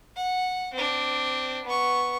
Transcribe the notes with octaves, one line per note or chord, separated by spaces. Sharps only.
F#5
C4 D4
B3 C#6